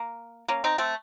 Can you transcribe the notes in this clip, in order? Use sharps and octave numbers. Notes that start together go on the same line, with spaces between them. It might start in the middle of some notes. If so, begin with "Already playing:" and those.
Already playing: A#3
A#3 C#4
C4 D#4
A3 C4